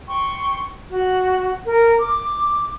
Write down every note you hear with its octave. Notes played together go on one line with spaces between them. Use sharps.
G5 C6 C#6
F#4
A#4
D6